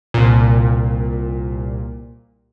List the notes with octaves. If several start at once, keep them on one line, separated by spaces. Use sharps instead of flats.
C2 A#2